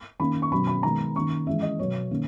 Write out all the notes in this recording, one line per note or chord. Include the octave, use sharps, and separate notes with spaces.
D#3 A#3 C#4 B5
C#6
B2 F#3 C#4 B5
B5
D#3 G#3 B3 A#5
D#3 A#3 C#4 C#6
E3 G#3 C#4 E5
D#5
B2 F#3 B3 C#5
D#3 A#3 C#4